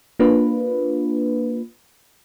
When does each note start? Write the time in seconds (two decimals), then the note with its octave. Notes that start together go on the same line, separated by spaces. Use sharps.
0.19 A#3 D4 F4 B4